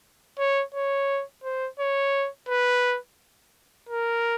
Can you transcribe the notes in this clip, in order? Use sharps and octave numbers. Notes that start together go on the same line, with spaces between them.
C#5
C#5
C5
C#5
B4
A#4